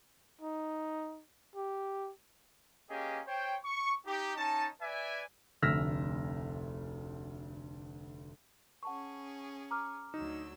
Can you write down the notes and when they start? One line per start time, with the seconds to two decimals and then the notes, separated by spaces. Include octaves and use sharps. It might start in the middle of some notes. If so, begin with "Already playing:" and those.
0.41 D#4
1.56 G4
2.89 A#3 C#4 G4 G#4 D#5
3.27 C5 C#5 G5
3.64 C#6
4.06 D#4 G4
4.36 C#4 D#4 A5
4.81 B4 D5 E5 G#5
5.62 F1 D2 E6 F6 A#6 B6
8.83 C#4 G#4 F#5 A5 C#6
9.71 A#5 D6 F6
10.14 D2 F#3 D#4 E6